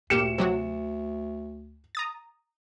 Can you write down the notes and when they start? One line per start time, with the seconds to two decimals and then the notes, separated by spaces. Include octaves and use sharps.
0.10 D2 A#2 G4 F6 C#7 E7
0.38 C3 F#3 F#4
1.95 A#5 D#6 A6